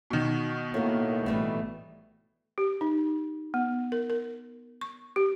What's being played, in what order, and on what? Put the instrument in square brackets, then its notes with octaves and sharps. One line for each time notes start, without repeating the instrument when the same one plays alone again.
[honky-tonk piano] B2 D#3
[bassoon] A2 [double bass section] A#3 [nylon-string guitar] F#4 A#4
[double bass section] A1 [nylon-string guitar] E3 G3 A3
[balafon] G4
D#4
B3
A#4
A#4
C#6
G4